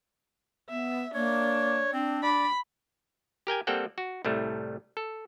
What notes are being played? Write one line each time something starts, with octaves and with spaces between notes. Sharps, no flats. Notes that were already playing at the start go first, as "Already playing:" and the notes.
B3 E5
A#3 D4 C#5
C4 D4
D5 B5
G4 A#4 G5 G#5
G3 A#3 C4 A4 F#5 G5
F#4
C2 A2 G3 A3
A4